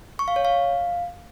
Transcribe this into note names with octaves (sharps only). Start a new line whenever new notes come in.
C#6
F5
C#5
F5